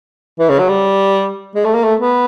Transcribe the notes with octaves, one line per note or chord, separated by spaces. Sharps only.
E3
C#3
F#3
G3
G#3
A3
A#3
A3
B3